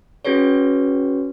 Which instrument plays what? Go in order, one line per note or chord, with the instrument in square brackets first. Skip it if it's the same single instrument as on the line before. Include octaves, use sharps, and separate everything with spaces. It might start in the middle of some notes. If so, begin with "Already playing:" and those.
[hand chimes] C#4 F#4 G#4 B4 C#5